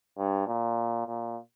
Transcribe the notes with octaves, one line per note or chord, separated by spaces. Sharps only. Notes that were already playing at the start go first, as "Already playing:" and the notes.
G2
A#2
A#2